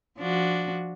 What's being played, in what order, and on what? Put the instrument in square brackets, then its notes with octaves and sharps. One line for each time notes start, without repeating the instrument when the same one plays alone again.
[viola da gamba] F3 D4 F#4